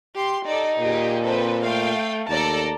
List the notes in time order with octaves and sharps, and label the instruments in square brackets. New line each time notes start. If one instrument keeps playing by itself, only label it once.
[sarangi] G4 [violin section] C6
[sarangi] D#4 [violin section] A4 D5
[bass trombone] A#2 [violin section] G4 G#4
[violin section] C4 A4 B4
[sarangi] A3 [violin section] F5 G5
[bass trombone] D#2 [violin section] A4 D5 A#5 [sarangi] A5